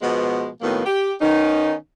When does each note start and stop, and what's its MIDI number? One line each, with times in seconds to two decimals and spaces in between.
0.01 0.47 47
0.01 0.47 53
0.01 0.47 56
0.01 0.47 59
0.61 0.82 45
0.61 0.82 51
0.61 0.82 54
0.61 0.82 58
0.61 0.82 59
0.86 1.12 67
1.20 1.73 51
1.20 1.73 59
1.20 1.73 61
1.20 1.73 63